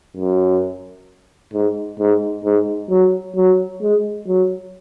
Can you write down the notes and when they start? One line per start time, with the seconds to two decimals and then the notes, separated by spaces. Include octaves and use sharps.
0.17 F#2
1.54 G#2
2.00 G#2
2.45 G#2
2.90 F#3
3.36 F#3
3.82 G#3
4.28 F#3